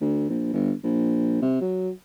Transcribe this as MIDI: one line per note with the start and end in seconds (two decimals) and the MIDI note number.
0.01 0.27 38
0.30 0.50 34
0.53 0.72 31
0.83 1.38 34
1.42 1.60 48
1.61 1.90 54